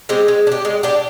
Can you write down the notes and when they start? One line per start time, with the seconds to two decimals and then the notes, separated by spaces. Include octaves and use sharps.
0.09 G#3 C4 G4
0.28 G#3
0.47 D4
0.52 G4
0.65 G#3
0.83 D4 G4